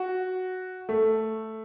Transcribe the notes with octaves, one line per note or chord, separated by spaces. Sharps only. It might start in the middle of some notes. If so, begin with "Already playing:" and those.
Already playing: F#4
A3